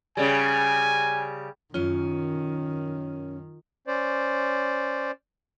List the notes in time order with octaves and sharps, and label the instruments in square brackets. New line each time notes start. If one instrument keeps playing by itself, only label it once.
[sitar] C#3 G3 [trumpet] G#5
[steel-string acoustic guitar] F#2 C#4 [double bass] D#3 [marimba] F4
[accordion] C#4 C5 D5